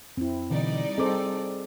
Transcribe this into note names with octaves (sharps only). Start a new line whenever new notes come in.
F2 C4 E4
B2 D3 E3 G3 D#4 D5
C4 G#4 A4 C5 D6